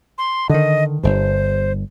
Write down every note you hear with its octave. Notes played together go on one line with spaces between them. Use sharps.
C6
D3 D#3 D#5
G1 G2 C5